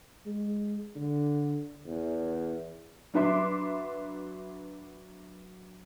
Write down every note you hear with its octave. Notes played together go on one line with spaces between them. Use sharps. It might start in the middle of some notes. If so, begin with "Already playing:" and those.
G#3
D3
E2
F#3 D4 B4 E5 C6 D6